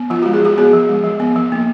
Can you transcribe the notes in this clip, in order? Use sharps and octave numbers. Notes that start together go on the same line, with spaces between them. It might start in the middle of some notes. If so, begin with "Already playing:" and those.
Already playing: B3
F3 F4
F#4
G#3
G#4
F3 F#4
B3 G#4
F3
G#3
F3
B3
F3
A#3